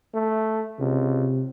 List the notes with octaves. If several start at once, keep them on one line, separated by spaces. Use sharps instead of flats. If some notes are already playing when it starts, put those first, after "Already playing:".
A3
C#2 C3